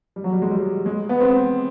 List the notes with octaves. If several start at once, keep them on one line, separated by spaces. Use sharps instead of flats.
G3
F#3
G3
G#3
G3
G#3
B3
C4